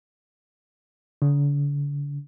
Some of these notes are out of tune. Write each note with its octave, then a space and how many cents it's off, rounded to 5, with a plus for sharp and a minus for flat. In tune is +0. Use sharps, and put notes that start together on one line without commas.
D3 -40